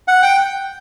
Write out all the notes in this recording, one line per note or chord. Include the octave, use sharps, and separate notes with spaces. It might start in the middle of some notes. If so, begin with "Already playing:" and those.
F#5
G5